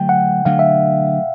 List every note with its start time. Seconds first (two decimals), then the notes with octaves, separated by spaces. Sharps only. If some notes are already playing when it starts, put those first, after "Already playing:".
Already playing: D3 F#3 A3 G5
0.09 F#5
0.45 D3 F#3 A3 F5
0.59 E5